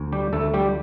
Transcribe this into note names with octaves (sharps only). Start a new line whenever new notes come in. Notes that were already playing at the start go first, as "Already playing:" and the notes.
Already playing: D2
G3 G4
D2 A3 A4
G3 G4